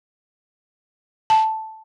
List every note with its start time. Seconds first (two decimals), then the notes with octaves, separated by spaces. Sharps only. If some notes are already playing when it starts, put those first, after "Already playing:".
1.30 A5